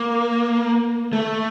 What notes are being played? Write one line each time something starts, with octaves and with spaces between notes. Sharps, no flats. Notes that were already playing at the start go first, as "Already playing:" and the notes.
Already playing: A#3
A3